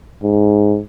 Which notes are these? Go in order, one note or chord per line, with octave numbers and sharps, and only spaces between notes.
G#2